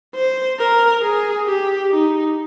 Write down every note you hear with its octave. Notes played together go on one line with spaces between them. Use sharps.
C5
A#4
G#4
G4
D#4